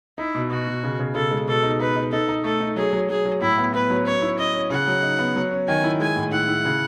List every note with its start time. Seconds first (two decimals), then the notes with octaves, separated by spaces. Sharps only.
0.18 D#4 E4
0.35 B2
0.50 B2 F#4
0.67 B2
0.83 C#3
1.00 C#3
1.15 C#3 A4
1.31 G#3
1.48 B2 A4
1.63 D#4
1.80 D#4 B4
1.96 D#4
2.12 D#4 A4
2.28 D#4
2.44 A3 A4
2.61 D#4
2.76 F#3 G#4
2.93 F#3
3.09 F#3 G#4
3.25 F#3
3.41 A2 E4
3.58 B3
3.74 B3 B4
3.90 F#3
4.06 C#4 C#5
4.22 E4
4.38 C#4 D#5
4.54 C#4
4.70 C#3 F#5
4.87 F#3
5.03 D#4
5.19 B3
5.36 F#3
5.51 C#4
5.68 D#3 G#5
5.84 E4
6.00 G#3 G#5
6.16 A2
6.32 E4 F#5
6.48 E4
6.65 C#3